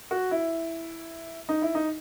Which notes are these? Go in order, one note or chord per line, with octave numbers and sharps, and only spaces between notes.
F#4
E4
D#4
E4
D#4